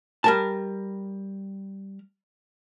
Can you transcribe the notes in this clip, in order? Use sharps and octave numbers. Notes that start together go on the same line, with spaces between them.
G3 A#4 A5